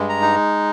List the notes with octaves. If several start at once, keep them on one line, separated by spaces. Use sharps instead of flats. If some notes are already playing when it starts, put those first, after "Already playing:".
Already playing: G2 G#3
A#5
D#4